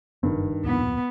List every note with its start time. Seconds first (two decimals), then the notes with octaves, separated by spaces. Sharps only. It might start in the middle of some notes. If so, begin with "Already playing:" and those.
0.23 F#1 G2 D#3
0.64 D1 F2 A#2 B3